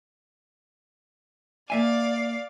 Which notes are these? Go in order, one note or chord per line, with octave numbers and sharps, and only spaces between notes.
A#3 D5 E5 F5 G#5